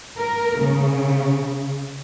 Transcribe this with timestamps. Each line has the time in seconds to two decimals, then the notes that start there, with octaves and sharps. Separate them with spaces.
0.17 A#4
0.59 C#3